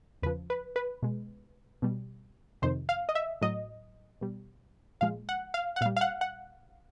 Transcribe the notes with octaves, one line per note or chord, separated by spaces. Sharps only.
E2 C#3 F3 B4
B4
B4
B2 G#3
B2 G3
F2 C3 D#3 C5
F5
D#5
E5
A2 F#3 D#5
B2 G3
A#2 F3 G#3 F5
F#5
F5
F#5
A#2 G3 F5
F5
F#5
F#5